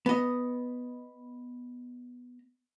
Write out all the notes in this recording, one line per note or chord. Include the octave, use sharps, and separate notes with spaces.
B3 D#5